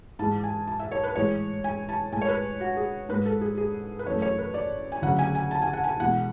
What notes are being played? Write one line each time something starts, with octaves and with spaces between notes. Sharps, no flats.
G#2 E3 G#3 A5
G#5
A5
E5
C#5
B4
A2 E3 G#3 C#5
G#5
A5
A2 G#3 G#5
C#5
B4
F#4
G#4
G#2 G#3 B4
A4
G#4
G#4
B4
F#2 E3 A3 C#5
C#5
B4
D5
G#5
D2 C#3 F#3 F#5
G#5
G#5
A5
G#5
F#5
G#5
E2 B2 G#3 F#5